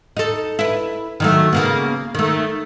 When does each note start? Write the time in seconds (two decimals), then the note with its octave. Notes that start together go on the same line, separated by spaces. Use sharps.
0.17 D#4 A4
0.59 E4 B4
1.20 D#3 F#3 A3
1.52 C#3 A#3 B3
2.15 D#3 A3